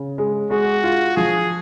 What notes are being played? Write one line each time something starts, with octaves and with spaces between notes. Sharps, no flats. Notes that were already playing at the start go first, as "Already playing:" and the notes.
Already playing: C#3
G#3
G#3 F#4
F4
F3 G#4